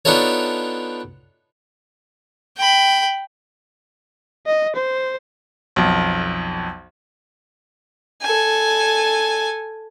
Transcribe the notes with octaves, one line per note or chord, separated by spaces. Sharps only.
B3 D4 D#4 F4 A4 C#5
G5 B5
D#5
C5
B1 F2
A4 G#5